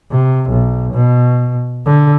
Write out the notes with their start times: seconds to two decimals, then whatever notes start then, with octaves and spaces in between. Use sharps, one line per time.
0.11 C3
0.50 B1
0.93 B2
1.86 D3